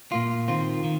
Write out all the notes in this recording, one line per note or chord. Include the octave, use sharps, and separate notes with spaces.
A#2 A#3 F4
D#3 C4 F4
D#3